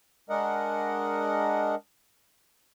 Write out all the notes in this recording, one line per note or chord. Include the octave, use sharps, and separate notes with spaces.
G#3 D4 A#4 D#5 F#5